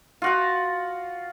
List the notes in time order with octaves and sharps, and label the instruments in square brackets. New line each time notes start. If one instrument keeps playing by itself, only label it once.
[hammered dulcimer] F4 F#4 F#5